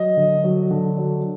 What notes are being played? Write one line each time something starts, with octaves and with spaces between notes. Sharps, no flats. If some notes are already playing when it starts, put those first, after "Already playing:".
Already playing: F#3 D#5
D3
F#3
D3
F#3